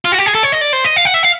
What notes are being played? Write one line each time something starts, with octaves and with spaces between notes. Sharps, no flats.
F4
F#4
G4
G#4
A4
C#5
D#5
D5
C5
D#5
F5
F#5
E5
F5